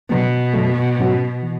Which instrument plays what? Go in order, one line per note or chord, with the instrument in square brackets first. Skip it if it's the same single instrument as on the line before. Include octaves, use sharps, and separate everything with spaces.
[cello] B2 [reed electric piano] D3 F#3 B3
[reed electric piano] F#2 D3 F#3 A3
G#2 F#3 C#4 F#4
E3